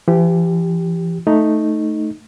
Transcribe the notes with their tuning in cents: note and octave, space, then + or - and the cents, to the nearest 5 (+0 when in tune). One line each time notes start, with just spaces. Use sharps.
E3 +45 G4 +0
A3 +0 D#4 +0